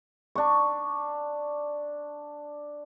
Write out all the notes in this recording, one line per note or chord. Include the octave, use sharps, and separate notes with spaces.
D4 C#6